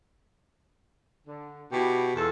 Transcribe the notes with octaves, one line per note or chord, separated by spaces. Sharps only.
D3
B2 E4 F#4 G4
E2 F4 A4